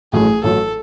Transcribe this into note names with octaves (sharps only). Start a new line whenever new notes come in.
A1 A2 F#3 A3 G#4
A1 A2 F#3 A3 A4